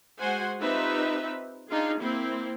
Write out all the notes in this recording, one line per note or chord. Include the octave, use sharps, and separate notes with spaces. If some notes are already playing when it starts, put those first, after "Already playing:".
G#3 F#4 C5 F#5 G#5
C4 D#4 F4 G4 B4 E5
D4 D#4 F4 G#4
A#3 C4 E4